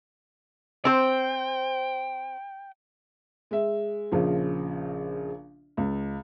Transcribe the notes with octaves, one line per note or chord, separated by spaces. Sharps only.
C4 C5 G5
G#3 E5
A#1 C#3 F3
C#2